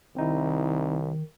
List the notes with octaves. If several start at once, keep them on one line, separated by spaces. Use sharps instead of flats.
C2 D#3 C4 D#4 E4